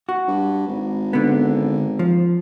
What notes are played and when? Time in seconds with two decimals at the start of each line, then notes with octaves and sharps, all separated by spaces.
0.09 F#4
0.28 G2
0.67 G#1
1.13 D3 B3
1.99 F3